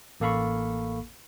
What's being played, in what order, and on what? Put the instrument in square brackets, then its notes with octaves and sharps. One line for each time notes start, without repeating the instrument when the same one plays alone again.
[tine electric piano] A1 A#3 A4 F5 B5 C#6